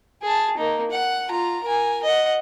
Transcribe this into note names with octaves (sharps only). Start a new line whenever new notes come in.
G#4 A5
A#3 D#4
F#5
F4 A#5
A#4 G#5
D#5 F#5